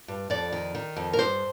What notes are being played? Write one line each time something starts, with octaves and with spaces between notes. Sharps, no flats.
G2
F2 D5
D#3
D#3
F2
A#4
G2 C5